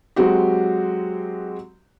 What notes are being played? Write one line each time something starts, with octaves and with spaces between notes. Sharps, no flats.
F#3 G#3 C4 F#4 G4